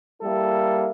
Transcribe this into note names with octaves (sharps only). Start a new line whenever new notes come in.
G3 A#3 E4 A4